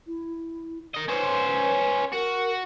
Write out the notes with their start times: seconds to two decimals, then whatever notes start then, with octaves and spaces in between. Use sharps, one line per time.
0.07 E4
0.95 A#4 D#5
1.09 C#4 B4 C5
2.13 F#4 A#4